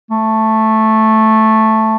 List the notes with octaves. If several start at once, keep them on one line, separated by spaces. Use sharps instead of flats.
A3